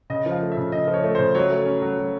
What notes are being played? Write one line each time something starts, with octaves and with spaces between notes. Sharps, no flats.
C#3 D#5
F3
F5
A3
E5
C#3
C#3 D#5
F3
C#5
A3
C5
C#3
F#3 C#5
A3
C#4
F#3
F#3